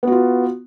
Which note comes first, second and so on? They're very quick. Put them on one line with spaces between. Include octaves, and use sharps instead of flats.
B3 F#4 F4